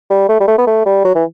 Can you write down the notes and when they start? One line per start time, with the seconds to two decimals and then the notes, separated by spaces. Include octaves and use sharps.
0.10 G3
0.29 A3
0.40 G3
0.48 A3
0.58 B3
0.67 A3
0.86 G3
1.05 F#3
1.15 E3